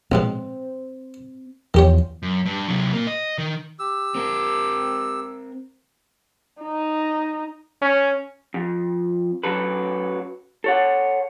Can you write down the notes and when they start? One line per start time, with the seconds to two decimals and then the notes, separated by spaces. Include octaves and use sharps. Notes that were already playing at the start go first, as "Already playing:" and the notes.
0.12 A#1 G#2 B2 C4
1.74 E2 D#3 F3 G4 C#5
2.23 F#2
2.46 G2
2.68 C3 F#3
2.93 A#2 A#3
3.07 D#5
3.38 D#3
3.79 G4 E6
4.15 C4 A#4
6.62 D#4
7.82 C#4
8.54 F2
9.44 F#2 F#3 A4 B4
10.64 A4 C#5 F#5